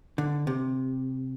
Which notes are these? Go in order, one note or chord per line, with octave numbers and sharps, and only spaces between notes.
D3
C3